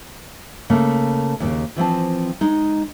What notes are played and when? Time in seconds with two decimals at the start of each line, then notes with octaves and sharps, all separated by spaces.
0.70 C#3 A3 A#3
1.40 D#2 A2 C#3
1.76 E3 F3 C4 A5
2.41 G#3 D#4